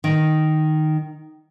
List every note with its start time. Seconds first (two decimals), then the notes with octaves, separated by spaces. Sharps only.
0.04 D#3